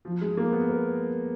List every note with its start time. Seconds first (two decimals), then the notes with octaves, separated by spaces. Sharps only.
0.05 F3
0.21 G#3
0.37 A#3
0.53 B3
0.69 A#4